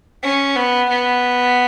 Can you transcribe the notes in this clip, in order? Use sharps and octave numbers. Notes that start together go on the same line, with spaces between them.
C#4
B3
B3